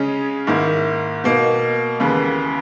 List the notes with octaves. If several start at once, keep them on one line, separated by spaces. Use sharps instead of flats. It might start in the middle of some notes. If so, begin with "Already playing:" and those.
Already playing: C#3 G#3 C#4 G#4
G#2 D#3 A#3 E4
B2 A#3 D#4
D#2 C#3 E3 B3